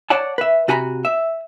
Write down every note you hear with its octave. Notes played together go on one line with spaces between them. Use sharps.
C#5 D5 F#5 A5
B4 E5
C3 F#4 G#5 A#5 B5
E5